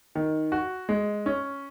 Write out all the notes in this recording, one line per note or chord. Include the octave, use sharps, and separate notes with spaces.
D#3
F#4
G#3
C#4